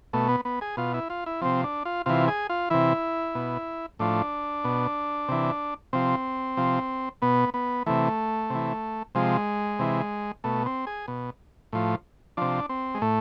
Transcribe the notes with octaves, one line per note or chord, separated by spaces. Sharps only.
B2 A3
B3
B3
G#4
B2 F4
E4
F4
E4
C3 F3 C4
D4
F4
C3 E3 F4
G#4
F4
C3 E3 E4
B2
A2 F3 D4
B2
C3 E3
C3 F3 C4
C3 F3
B2 B3
B3
C3 E3 A3
C3 E3
C3 F3 G#3
C3 E3
B2 A3
C4
G#4
B2
A2 F3
C3 F3 D4
C4
G#3
A2 A3